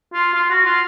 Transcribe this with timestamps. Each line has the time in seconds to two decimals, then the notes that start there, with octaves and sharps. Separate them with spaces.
0.13 F4
0.34 F4
0.50 F#4
0.65 F4